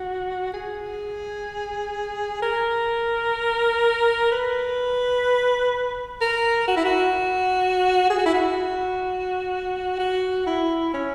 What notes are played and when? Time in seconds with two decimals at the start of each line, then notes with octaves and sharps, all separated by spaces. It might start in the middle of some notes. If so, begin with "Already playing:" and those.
Already playing: F#4
0.54 G#4
2.42 A#4
4.32 B4
6.21 A#4
6.68 F#4
6.77 E4
6.85 F#4
8.10 G#4
8.18 F#4
8.26 E4
8.34 F#4
9.99 F#4
10.46 E4
10.94 C#4